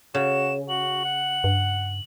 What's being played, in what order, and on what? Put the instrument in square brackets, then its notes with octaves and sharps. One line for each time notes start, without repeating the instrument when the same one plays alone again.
[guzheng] C#3 [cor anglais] F#4 [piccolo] E7
[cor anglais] F#4 [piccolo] F#7
[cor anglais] F#5
[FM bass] G2